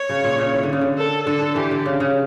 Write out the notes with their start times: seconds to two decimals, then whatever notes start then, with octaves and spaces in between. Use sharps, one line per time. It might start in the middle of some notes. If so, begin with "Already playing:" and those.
Already playing: C#5
0.09 C#3
0.24 A#2
0.38 C#3
0.53 E3
0.63 D3
0.73 C#3
0.81 D3
0.98 A4
1.27 D3 A4
1.42 D3
1.56 E3 G4
1.71 D3
1.86 C#3
2.00 C#3